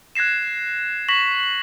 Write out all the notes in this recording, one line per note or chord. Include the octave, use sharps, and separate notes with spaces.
F#6 G#6 A#6 C7 E7
C#6 A#6 B6 E7 F#7